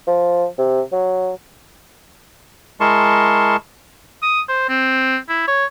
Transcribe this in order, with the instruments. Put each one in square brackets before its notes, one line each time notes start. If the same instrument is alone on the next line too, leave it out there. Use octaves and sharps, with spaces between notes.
[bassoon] F3
C3
F#3
[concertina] G#3 E4 A#4 A5 C6 C#6
[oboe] D#6
C5
C4
E4
C#5